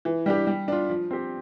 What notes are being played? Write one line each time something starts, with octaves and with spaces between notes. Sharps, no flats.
E3
G3 D4 G4
G3
D4 F4
F3
C4 G4